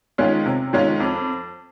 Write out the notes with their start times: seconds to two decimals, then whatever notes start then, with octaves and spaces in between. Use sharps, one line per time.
0.18 D#3 G#3 C#4 F4
0.46 C3
0.73 D#3 G#3 C#4 F4
1.00 F2